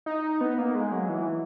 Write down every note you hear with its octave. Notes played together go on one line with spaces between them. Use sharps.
D#4
B3
A#3
G#3
F#3
E3